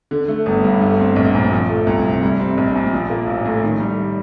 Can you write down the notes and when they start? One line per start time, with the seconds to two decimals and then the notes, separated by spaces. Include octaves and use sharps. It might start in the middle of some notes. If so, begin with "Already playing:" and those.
0.11 D3
0.28 A3
0.46 G1
0.63 G2
0.81 A3
1.00 C4
1.16 A#1
1.35 A#2
1.52 F3
1.69 A3
1.87 C2
2.04 C3
2.23 G3
2.40 C4
2.57 A#1
2.75 A#2
2.93 F3
3.10 A#3
3.27 A1
3.45 A2
3.63 D#3
3.80 G3